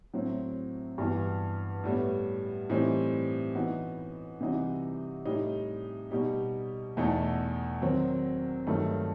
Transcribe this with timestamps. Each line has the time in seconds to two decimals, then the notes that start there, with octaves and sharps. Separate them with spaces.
0.14 A2 F#3 C4
0.98 G2 E3 B3 F#4
1.84 A2 G3 B3
2.70 A2 E3 G3 C4 D#4
3.55 E3 B3 D#4 F#4
4.40 C3 E3 G3 D#4 F#4
5.25 A2 G3 D#4 G4
6.11 B2 G3 D#4 G4
6.97 E2 B2 A3 D#4 A4
7.82 D#3 F#3 C4
8.67 G2 D#3 F#3 A3 D#4